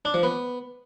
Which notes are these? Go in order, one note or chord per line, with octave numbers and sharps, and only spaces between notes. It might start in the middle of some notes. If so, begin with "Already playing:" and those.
D4
F3
B3